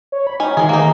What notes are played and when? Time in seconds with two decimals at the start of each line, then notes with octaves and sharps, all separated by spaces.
0.12 C#5
0.27 B5
0.40 C#4 D#4 G#5
0.57 D#3 G#3 G#4
0.69 A#3 D#4